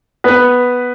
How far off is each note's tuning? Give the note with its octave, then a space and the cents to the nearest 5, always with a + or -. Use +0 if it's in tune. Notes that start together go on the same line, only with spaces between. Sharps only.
B3 +0 B4 +0